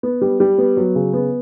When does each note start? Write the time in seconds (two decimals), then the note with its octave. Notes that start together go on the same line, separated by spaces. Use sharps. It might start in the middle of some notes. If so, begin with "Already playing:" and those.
0.03 B3
0.21 G3
0.40 G3
0.58 B3
0.77 F#3
0.95 C#3
1.13 B3